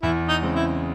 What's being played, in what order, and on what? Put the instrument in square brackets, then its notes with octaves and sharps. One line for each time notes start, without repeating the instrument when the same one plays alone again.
[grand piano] E2 [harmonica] E4
[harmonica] D#4
[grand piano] C#3 G#3 C4
[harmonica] E4